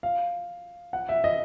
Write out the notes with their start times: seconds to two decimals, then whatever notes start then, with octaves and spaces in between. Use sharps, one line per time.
0.03 F5
0.93 F#5
1.09 E5
1.24 D#5